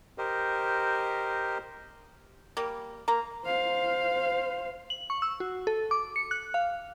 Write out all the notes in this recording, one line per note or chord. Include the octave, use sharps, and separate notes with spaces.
G4 A#4 C5 D#5
G3 A#3
A#3 A#5
C5 F5
F#7
C#6
E6
F#4
A4
D6
C#7
F#6
F5